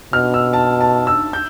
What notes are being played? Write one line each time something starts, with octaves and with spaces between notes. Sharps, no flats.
B2 F6
E6
A5
A5
E6
G6